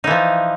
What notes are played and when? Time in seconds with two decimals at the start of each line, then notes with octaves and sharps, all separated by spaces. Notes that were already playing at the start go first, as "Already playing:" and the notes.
0.04 D#4
0.07 E3
0.11 F3